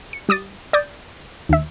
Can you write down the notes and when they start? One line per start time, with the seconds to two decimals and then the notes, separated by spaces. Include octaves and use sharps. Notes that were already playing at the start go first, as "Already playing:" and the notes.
0.13 C#7
0.29 G3 D6 D#6 A6
0.73 D5 D6 D#6 G6 A6
1.49 D#2 E5